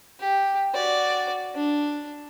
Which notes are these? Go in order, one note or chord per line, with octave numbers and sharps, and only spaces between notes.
G4
F#4 D5
D4